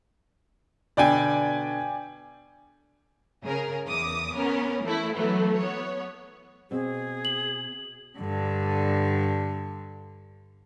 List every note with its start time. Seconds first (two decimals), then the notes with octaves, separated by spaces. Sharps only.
0.97 B2 D3 D5 G5 G#5
3.44 C#3 G#4 A#4
3.86 E2 D6 D#6
4.35 B3 C#4 A#4
4.84 E3 A3 E4
5.15 E3 F#3 A3 B3
5.59 B3 C#5
6.71 B2 C4 G#4
7.25 F#7
8.18 G2 D3